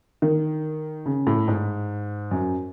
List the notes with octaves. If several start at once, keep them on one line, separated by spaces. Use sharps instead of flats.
D#3
C#3
A2
G#2
F#2